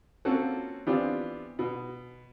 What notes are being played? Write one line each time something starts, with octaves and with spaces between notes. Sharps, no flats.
A#3 C4 C#4 F4 F#4 A4
E3 B3 C4 D4 F4 G4
B2